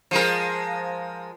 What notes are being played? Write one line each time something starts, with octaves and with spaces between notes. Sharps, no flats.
F3 G#3 A#4